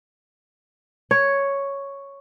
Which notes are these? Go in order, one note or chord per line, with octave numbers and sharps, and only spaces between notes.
C#5